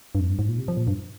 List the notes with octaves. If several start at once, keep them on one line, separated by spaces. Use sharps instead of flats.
G2
F2
G2
G#2
A#2
C3
F3
A#2
G2